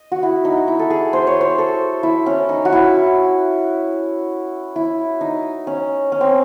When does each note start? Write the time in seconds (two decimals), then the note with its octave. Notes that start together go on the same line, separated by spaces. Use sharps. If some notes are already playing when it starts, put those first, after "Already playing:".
Already playing: D#5
0.12 F#4
0.23 E4
0.45 D#4
0.68 E4
0.79 A4
0.90 G#4
1.13 C5
1.27 C#5
1.41 C5
1.58 A4
2.03 E4
2.26 C#4
2.49 D#4
2.65 F#4
2.72 E4
4.76 E4
5.21 D#4
5.67 C#4
6.12 C#4
6.21 C4